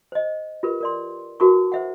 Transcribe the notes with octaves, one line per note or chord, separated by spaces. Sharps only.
C5 D#5
F4 G4 A#4 B4
A#4 D5 C6
E4 F#4 A#4 B4 A5 C#6
C5 E5 F#5